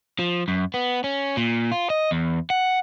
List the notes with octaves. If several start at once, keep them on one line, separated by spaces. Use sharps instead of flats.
F3
F#2
B3
C#4
A#2
F4
D#5
E2
F#5